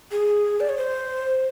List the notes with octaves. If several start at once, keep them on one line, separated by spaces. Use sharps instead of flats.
G#4
D5
C#5
C5